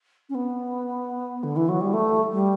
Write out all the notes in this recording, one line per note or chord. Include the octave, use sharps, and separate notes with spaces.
C#4
B3
D3
E3
F#3
G3
A3
G3